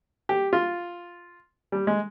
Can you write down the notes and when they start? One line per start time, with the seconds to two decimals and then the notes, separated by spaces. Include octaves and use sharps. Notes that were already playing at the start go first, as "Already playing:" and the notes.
0.29 G4
0.53 F4
1.72 G3
1.87 G#3